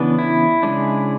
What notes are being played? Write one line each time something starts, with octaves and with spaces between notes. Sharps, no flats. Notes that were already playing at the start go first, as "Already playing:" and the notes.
Already playing: C#3 E3 B3 D4
E4
C#3 G#3 D4